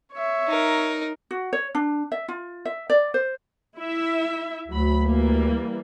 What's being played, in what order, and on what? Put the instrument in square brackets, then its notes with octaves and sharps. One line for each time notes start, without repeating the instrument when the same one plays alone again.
[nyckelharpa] C#5 E5
[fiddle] D#4 A#4
[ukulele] F#4
C#5
D4
E5
F4
E5
D5
C5
[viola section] E4 E5
[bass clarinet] D2 [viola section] F#3 B5
[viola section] E3 G3 A#3